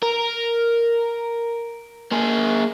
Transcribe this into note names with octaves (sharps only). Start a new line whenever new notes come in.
A#4
A#3 G#4